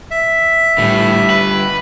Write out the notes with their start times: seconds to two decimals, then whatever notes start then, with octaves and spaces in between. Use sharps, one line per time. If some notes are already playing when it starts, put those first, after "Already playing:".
0.11 E5
0.78 A2 D3 G3
1.30 B4